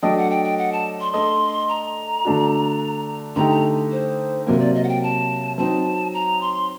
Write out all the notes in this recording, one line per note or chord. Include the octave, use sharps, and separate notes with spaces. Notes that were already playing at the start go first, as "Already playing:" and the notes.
F#3 A3 D4 A4 D#5 G5
F#5
G5
G5
F#5
A5
C6
A3 D4 A4 D#5 C6
A#5
D3 A3 D4 F#4
D3 A3 D#4 G4 A#5
A#5
C5
C3 F#3 A#3 A#4
D5
D#5
F#5
G5
A5
F#3 C4 D#4 A5
A#5
C6